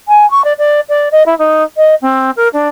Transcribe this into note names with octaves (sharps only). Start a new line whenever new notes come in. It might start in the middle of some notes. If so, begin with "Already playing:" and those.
G#5
C#6
D5
D5
D5
D#5
E4
D#4
D#5
C4
A#4
D4